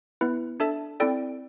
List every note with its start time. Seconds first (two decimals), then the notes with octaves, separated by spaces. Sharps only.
0.21 B3 E4 B4
0.60 D4 A4 E5 A5
1.00 C4 E4 A4 D5 G5